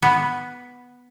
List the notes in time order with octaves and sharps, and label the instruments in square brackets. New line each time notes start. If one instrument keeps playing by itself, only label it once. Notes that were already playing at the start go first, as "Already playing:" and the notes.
[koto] B3